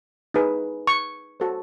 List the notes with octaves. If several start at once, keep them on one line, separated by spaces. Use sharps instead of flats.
D#4 G#4 B4
C#6
F#4 A4 C5